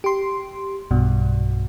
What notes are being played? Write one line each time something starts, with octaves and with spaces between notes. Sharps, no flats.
G4 C6
B1 G2 B2